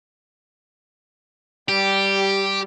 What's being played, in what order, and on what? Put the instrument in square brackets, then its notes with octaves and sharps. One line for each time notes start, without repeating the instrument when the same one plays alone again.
[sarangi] G3 [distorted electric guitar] G4